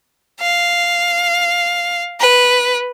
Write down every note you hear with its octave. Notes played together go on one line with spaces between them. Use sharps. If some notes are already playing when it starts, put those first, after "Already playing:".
F5
B4